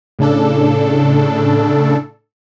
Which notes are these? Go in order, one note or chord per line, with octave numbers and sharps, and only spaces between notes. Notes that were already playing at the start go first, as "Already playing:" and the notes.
A2 C#3 D4 A4